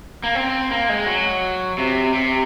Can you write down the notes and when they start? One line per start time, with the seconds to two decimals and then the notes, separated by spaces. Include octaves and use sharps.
0.24 A#3
0.35 C4
0.71 A#3
0.89 G#3
1.06 F#3
1.78 C3
2.14 C3